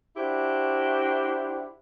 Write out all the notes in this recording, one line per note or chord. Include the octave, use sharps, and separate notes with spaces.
D4 E4 F#4 G4 C5